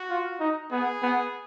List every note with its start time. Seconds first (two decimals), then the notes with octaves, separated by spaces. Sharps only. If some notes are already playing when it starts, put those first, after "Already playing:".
Already playing: F#4
0.10 F4
0.40 D#4
0.71 B3 G#4
1.02 B3